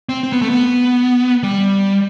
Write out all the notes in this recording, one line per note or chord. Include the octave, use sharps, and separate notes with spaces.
C4
C4
B3
A3
B3
G3